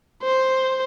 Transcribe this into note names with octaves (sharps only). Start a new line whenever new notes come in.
C5